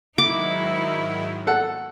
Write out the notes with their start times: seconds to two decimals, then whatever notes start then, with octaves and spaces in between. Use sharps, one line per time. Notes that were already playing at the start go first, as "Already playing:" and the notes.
0.18 G#2 D#3 F#3 D#4 E4 D6
1.47 A4 F#5